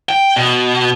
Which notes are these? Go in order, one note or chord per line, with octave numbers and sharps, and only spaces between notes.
G5
B2